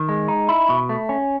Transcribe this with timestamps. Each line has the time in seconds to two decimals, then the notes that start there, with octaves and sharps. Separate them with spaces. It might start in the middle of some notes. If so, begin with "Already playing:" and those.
Already playing: D#3
0.09 G#3
0.28 D#4
0.49 E4
0.69 B2
0.89 A3
1.09 C#4